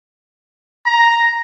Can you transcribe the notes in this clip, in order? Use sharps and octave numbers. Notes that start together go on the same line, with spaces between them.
A#5